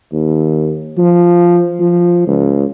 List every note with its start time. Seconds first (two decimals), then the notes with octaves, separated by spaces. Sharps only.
0.12 D#2
0.98 F3
1.80 F3
2.27 C#2